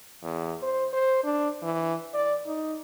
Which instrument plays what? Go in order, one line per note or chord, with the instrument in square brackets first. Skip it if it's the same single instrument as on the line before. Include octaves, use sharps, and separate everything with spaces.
[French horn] E2
C5
C5
D4
E3
D5
D#4